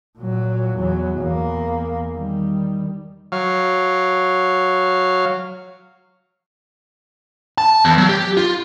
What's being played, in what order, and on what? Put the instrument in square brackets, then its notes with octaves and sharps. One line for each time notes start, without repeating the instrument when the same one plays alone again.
[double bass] A#2 F#3
E2 F#3
E2 A#3
D#3 G3
[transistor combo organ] F#3 F5
[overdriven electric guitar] A5
E2
F#3
G4
F4